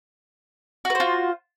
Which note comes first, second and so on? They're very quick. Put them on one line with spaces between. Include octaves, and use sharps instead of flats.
F#4 B4 C5 F4